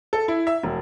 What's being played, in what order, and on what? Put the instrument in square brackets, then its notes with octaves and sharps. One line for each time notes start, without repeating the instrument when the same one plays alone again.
[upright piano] A4
E4
E5
E1